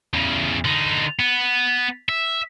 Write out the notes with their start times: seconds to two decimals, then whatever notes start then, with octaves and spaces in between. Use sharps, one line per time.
0.14 E2 C#3
0.65 D3 D#4
1.20 B3
2.09 E5